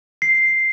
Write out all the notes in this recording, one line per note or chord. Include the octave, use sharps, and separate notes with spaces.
C7